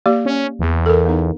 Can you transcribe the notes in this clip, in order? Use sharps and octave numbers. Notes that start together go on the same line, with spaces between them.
A#3 G4 D5
C#4
E2
A4 A#4
B3 D#4